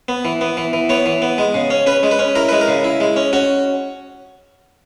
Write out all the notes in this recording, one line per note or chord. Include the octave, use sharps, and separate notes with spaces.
B3
E3
B3
E3
E3
B3 C#5
E3
B3
G#3
C#3
C#4
C#4 B4
G#3
B4
C#4
E4 A#4
G#3 B4
A#4
C#3
E4
G#3
C#4
C#4 F#4